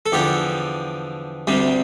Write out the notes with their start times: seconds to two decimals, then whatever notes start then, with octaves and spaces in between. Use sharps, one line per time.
0.06 A4
0.12 E2 D3 F3 G4
1.47 D2 C3 G3